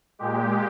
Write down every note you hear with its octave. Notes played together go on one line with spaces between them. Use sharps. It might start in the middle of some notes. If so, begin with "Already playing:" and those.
A#2 G#3 G4